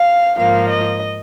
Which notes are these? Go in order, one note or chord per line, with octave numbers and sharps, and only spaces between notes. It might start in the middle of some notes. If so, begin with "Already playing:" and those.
Already playing: F5
G#2 F3 A#3 F5
D#5